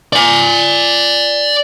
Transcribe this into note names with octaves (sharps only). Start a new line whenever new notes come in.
D5 G#5